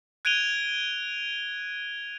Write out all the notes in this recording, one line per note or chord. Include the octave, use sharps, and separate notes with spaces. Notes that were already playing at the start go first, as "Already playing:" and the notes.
F#6 G#6 D7 D#7 F7 G7